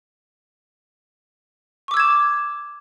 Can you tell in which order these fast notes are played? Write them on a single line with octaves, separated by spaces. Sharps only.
C#6 D6 E6 G#6 E7